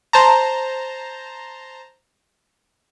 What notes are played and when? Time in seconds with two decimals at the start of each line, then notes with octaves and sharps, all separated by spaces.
0.13 C5 A5 A#5